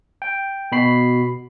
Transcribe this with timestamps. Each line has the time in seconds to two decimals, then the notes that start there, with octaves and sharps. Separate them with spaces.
0.22 G5
0.72 B2 F#4 B5 C7